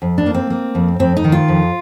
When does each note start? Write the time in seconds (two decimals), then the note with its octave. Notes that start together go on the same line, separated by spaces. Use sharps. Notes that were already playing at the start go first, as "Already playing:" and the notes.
0.02 F2
0.18 D4
0.26 A#3
0.34 C4
0.50 A#3
0.75 F2
0.99 F2 C4
1.17 D#4
1.24 D#3
1.32 F4
1.48 F2